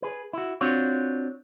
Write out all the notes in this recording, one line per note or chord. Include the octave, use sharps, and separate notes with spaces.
G#4 B4
E4 F#4
C4 D4 F4 F#4 C#5